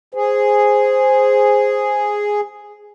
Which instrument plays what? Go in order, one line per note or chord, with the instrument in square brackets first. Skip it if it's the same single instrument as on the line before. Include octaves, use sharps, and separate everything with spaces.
[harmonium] G#4 [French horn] C5